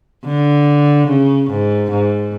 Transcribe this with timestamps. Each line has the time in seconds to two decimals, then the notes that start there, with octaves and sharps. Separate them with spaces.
0.25 D3
1.07 C#3
1.49 G#2
1.90 G#2